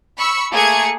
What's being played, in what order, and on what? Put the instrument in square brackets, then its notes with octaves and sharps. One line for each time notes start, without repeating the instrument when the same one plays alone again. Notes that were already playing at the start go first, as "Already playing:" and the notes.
[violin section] B5 C#6 E6
A3 A#3 G#4 G#6 C#7